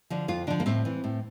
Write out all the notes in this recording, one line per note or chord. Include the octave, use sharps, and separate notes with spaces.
D3 F3
F2 F4
D3 F3 D4
A#3
A2 C4
E3
A2